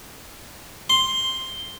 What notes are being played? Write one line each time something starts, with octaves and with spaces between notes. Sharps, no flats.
C6